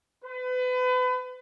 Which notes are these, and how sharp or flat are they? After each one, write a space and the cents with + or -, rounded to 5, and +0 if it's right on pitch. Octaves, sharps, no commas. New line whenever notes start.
B4 +35